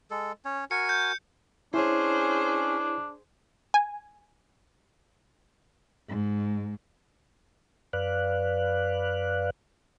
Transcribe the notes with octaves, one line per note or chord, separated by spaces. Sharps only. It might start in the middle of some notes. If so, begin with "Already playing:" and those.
G#3 A4
C#4 C#5
F#4 A#4 G#5 C#7
G6
C#4 D4 E4 G#4 C5 C#5
G#5
G#2
F#2 B4 D5 F5 F#6